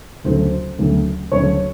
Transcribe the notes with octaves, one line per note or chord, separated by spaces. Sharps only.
D2 C#3 F#3 A3 C5
D2 C#3 F#3 A3
D2 C#3 F#3 A3 C#5